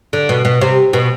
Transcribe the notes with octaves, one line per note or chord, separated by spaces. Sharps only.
D3
B2
B2
C3
B2